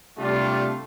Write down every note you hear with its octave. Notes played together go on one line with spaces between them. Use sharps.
C3 G3 A3 D4 F4